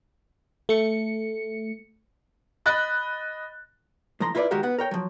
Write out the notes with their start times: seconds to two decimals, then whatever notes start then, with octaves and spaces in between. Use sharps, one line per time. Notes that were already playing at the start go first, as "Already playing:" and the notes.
0.69 A3 C#7
2.66 D#5 B5 F#6 A6
4.20 A2 F3 A#5 C6
4.35 E4 F4 B4 C#5 D5
4.51 D#3 G#3 F#4 G4 A#4 F5
4.63 B3 F#5
4.79 A#4 C#5 G5
4.91 F3 F#3